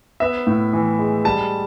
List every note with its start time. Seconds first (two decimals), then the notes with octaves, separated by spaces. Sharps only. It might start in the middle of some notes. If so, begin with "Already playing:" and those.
0.20 B3 E5
0.47 A2
0.73 E3
0.99 G#3
1.25 G3 A5